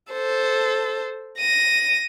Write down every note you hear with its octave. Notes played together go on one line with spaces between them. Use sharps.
A4 C5
A#6 D#7